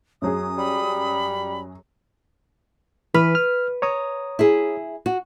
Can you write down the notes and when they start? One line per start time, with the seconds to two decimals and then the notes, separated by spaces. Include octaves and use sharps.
0.22 F#2 F#3 G#4 D#6
0.58 G3 B5
3.14 E3 B4 B5 F6
3.35 F6
3.82 C#5 A#5 D#6
4.39 E4 G#4
5.06 F#4